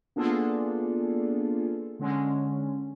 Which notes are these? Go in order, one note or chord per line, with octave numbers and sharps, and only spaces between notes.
A#3 B3 D4 F4 G#4 A4
D3 G#3 C#4